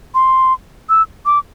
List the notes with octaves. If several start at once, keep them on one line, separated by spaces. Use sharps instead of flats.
C6
E6
D6